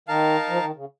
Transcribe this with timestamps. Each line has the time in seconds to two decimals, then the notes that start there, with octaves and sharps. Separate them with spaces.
0.08 D#3 D#4 A#4 F5 A5
0.49 F3
0.62 D#3
0.76 C#3